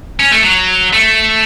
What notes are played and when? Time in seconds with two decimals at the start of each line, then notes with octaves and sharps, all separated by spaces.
0.19 C#4
0.32 A3
0.43 F#3
0.93 A3